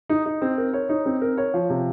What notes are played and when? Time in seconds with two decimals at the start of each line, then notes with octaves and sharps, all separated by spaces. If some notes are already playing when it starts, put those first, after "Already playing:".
0.09 D#4
0.26 D#4
0.42 C4
0.58 A#4
0.73 C#5
0.89 D#4
1.06 C4
1.21 A#4
1.37 C#5
1.54 F3
1.70 C3